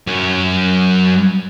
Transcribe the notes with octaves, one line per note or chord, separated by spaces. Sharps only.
F#2 C#4